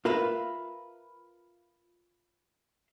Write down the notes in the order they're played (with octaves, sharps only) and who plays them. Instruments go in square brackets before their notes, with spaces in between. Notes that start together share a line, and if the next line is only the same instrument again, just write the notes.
[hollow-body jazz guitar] F4 A#4 B4 E5 F5